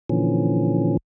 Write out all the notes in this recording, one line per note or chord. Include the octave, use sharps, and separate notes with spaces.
A#2 D3 E3 F3 C#4